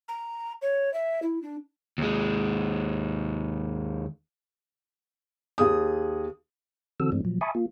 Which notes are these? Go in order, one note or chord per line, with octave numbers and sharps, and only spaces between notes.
A#5
C#5
E5
E4
D4
D#2 G#3
D#2 G#4 D#6
D3 E3 C4 F#4 A4 E6
G2 E3 G#3 A3 C4 D4
A#2 F3 F#3
E5 G#5 A5 B5 C#6 D#6
A#3 F4